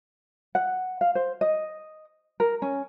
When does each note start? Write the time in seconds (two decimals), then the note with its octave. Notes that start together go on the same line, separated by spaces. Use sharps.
0.55 F#5
1.01 F5
1.15 C5
1.41 D#5
2.40 A#4
2.62 C#4